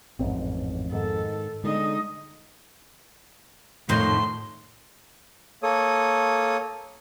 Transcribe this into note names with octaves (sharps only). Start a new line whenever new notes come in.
A1 F2 G#2 C4
G#2 D#3 A4
D3 G#3 D#4 D#5
F2 A2 D#3 C6
A#3 A4 C#5 D#6